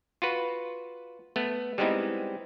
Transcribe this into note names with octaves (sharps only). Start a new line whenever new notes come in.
F4 F#4 B4
A3 B3
G3 G#3 B3 C4 D#4 E4